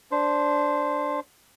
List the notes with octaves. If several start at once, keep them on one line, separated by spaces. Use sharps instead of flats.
D4 C5